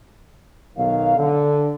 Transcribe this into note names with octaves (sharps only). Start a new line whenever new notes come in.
B1 D#3 F#3 F5
D3